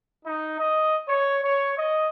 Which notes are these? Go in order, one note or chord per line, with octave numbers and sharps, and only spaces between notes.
D#4
D#5
C#5
C#5
D#5